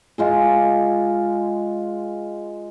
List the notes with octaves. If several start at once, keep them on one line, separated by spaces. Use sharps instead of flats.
G#3 F4 G#4